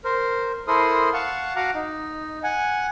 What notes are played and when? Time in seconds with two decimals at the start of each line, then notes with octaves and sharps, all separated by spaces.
0.04 A#4 C5
0.68 E4 A4 A#4 C5 C6 D#6
1.13 F5 F#5 A5 C#6
1.56 F#4 F5 F#5 A#5 D6
1.74 D#4
2.44 F#5 G#5